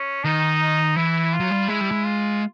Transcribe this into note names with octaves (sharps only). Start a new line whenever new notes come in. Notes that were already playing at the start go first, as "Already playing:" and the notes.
Already playing: C#4
D#3 D#4
E3 E4
F4
F#3
G3
G#3 E4
G3
G#3
F4